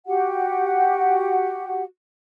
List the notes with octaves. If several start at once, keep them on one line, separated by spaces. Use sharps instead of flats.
F#4 G4 F#5